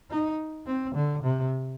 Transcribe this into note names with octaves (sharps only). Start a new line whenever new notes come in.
D#4
C4
D3
C3